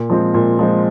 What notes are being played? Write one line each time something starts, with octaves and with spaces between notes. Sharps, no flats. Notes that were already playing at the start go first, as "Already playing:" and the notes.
Already playing: A#2
F3 G#3 C4
A#2
F3 G#3 C4